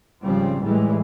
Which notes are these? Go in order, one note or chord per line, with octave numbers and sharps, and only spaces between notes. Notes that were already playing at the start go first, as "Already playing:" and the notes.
G#1 C#3 F3 G3 C4
A2 E3 G3 G#3